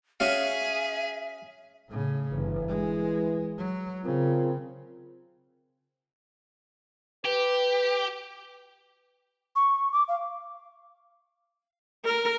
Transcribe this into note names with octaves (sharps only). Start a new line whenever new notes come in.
C#4 F#4 G#4 E5 F5
A2 C#3
G1 E3
G#3
F#3
C#3 C4 F4 A#4
G4 B4
C#6
D6
F5
A#4